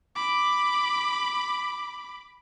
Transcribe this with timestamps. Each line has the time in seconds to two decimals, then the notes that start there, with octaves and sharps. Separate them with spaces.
0.16 B5 D6